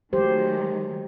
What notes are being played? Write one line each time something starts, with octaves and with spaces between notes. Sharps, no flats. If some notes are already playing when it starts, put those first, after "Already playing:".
D#3 F#3 G#3 A3 G4 C5